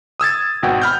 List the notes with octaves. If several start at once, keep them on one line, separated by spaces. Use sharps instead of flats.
D#6 E6 G#6 A6
G#1 B2 F#5 G5
B5 F6 G6